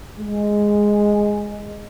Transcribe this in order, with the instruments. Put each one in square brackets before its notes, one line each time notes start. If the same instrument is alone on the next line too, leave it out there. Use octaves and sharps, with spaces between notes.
[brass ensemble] G#3